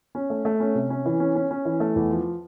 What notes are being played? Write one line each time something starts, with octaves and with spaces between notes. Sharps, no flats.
C#4
A3
A3
C#4
C3
C#4
E3
C#4
C#4
C#4
E3
A3
E2
F3